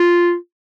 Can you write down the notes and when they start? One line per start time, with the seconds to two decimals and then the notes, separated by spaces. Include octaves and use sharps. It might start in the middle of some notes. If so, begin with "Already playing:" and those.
Already playing: F4